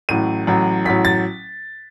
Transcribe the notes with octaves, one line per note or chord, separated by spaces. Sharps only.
A1 A2 F#3 D#7
A1 A2 F#3
A1 A2 F#3 B6
A6